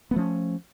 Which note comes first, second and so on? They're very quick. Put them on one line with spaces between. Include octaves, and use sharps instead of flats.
B3 A3 F3 C#4